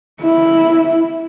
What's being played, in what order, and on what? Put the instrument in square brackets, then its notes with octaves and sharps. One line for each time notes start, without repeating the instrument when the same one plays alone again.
[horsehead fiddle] E4